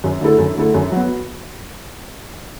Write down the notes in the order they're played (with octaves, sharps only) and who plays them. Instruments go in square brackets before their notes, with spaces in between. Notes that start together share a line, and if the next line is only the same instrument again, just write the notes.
[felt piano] F#2
D3 A3 E4 A4
F#2
D3 A3 E4 A4
F#2
F#3 B3